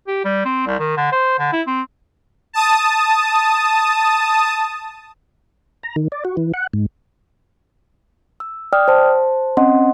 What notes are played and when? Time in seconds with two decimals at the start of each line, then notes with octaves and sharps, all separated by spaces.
0.07 G4
0.24 G3
0.45 C4
0.66 C2
0.79 D#3
0.97 D3
1.12 C5
1.39 D3
1.52 E4
1.67 C4
2.53 A5 D#6
5.83 A#5
5.96 D#3
6.12 D5
6.25 F#4
6.37 E3
6.54 F#5
6.74 G#2
8.40 E6
8.73 D5 G5 D#6 F6
8.88 C5 A5
9.57 C4 C#4 D#5 F#5 C6